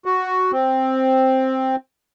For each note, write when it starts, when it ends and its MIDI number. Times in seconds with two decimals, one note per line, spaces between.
0.05 0.51 66
0.52 1.76 60